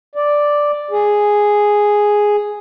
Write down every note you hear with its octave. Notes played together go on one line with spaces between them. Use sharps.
D5
G#4